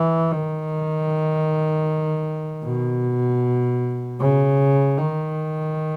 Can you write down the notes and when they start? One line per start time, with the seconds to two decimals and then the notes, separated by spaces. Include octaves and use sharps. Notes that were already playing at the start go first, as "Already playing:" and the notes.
Already playing: E3
0.32 D#3
2.64 B2
4.19 C#3
4.98 D#3